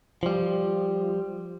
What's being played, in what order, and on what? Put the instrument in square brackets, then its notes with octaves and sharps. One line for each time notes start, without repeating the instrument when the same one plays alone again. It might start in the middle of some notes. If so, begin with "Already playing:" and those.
[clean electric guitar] F3 G3